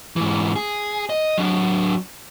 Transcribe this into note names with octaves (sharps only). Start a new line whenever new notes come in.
G#2 E3
G#4
D#5
F#3 D4